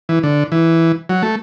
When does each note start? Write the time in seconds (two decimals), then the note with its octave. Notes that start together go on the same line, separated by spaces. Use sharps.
0.09 E3
0.23 D3
0.52 E3
1.09 F#3
1.23 A3